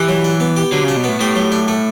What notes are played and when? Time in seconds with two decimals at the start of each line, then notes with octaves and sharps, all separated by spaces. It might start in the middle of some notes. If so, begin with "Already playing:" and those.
Already playing: E3 G4
0.08 F#3
0.24 D4
0.40 B3
0.56 G4
0.72 D3 F#3
0.84 C#3 D4
0.96 B2
1.04 A2 B3
1.20 A2 G4
1.36 F#3
1.52 D4
1.68 A3